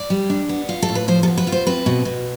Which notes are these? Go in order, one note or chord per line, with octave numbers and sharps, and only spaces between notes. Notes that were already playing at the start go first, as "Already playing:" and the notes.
Already playing: D5
G3
D4
B3
F4
A4
A2
B4
F3 C5
A4
B3
B4
F4
C5
C4 B4
B2
B2